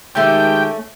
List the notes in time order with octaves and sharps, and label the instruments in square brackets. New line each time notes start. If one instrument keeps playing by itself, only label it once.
[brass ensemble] D#3 G#3 G4 [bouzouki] A3 C#4 [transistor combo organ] G5